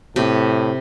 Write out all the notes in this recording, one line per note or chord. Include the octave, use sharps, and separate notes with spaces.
A2 C3